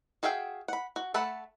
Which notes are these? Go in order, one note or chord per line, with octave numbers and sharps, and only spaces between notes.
F#4 G#4 E5 F5 G5
F#5 B5
F#4
A3 A4 F#5 A5 B5